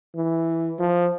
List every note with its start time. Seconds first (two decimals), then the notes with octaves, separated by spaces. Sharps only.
0.16 E3
0.79 F3